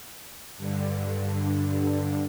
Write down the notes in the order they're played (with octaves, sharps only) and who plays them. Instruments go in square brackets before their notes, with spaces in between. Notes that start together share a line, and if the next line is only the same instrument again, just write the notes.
[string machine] G2 D3